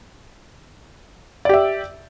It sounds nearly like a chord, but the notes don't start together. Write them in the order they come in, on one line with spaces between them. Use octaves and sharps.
D5 G4 E5